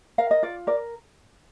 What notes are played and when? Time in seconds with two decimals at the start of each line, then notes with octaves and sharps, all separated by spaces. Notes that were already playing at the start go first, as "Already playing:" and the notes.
0.18 A#4 F5
0.31 D#5
0.43 F4 D5
0.67 A#4 D5